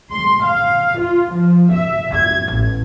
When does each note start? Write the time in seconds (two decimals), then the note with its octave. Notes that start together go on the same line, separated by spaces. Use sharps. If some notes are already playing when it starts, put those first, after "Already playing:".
0.11 C6
0.44 F5
1.00 F4
1.32 F3
1.72 E5
2.15 G#6
2.53 A1